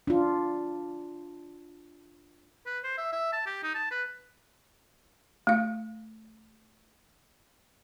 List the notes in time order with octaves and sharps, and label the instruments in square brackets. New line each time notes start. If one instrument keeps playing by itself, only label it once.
[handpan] D4 F4
[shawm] B4
C5
E5
E5
A5
G4
D#4
A5
B4
[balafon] A3 F5